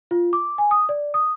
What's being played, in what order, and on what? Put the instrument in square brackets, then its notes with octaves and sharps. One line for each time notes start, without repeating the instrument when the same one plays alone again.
[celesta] F4
D6
G#5
D#6
D5
D#6